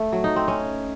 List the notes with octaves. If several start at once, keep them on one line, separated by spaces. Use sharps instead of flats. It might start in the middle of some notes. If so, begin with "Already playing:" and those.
Already playing: A3
F#3
D#4
C4
C#4